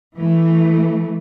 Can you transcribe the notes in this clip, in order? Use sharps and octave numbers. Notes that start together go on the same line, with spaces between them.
E3 A3